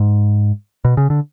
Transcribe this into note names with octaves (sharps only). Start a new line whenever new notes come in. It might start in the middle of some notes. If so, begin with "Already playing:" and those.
Already playing: G#2
B2
C#3
D3